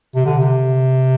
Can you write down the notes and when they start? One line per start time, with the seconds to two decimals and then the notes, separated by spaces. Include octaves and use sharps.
0.15 C3
0.26 D3
0.37 C3